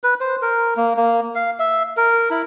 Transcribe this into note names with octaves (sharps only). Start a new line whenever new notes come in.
B4
C5
A#4
A#3
A#3
F5
E5
A#4
E4